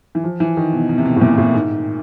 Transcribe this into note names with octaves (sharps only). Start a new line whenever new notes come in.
E3
F3
E3
D#3
B2
B2
C3
B2
A2
A#2
A2
G#2